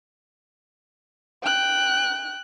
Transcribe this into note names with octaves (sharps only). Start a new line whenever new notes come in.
G5 F#6